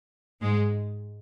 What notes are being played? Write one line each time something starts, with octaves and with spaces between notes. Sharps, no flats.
G#2 G#3